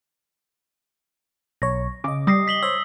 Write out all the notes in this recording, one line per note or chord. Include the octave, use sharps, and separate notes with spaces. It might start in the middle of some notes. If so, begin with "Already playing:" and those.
B1 C#5 A#6
C#3 D#5 D6
G3 D#6 A#6 C7
B6 F#7 G7
C5 C#5 E6